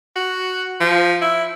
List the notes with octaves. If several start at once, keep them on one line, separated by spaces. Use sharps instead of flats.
F#4
F3
E4